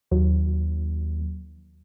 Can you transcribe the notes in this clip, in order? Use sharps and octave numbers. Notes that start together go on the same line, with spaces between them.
D#2 F#3